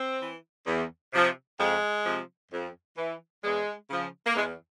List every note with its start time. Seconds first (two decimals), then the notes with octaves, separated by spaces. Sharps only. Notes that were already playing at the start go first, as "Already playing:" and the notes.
Already playing: C4
0.20 E3
0.67 E2
1.13 C3 F3
1.59 F2 G#3
2.05 C3 F3
2.51 F2
2.97 E3
3.44 E2 G#3
3.90 C#3 F3
4.26 A#3
4.36 E2 G#3